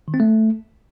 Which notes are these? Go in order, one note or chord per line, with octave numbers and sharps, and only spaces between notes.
D#3
C4
A3